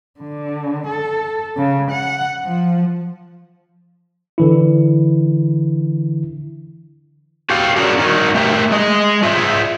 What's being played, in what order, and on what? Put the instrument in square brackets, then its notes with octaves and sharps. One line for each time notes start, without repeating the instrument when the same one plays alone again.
[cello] D3
A4
C#3
F#5
F3
[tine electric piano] D3 E3 E4
[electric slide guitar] F#4 G4 F5
C#4 D4 F#4 G#4 A#4
D#4 F#4 A#4 D#5
A3 G4 A#4 E5
G#3 G#4 D#5
F4 G#4 C5 E5